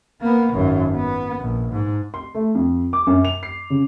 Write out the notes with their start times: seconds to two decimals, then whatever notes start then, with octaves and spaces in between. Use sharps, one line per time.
0.21 A#3 B3
0.53 G#1 F#2
0.96 B3
1.40 A#1
1.72 G#2
2.14 C6
2.35 A3
2.55 F2
2.93 D6
3.07 F#2
3.25 F7
3.43 C7
3.70 C#3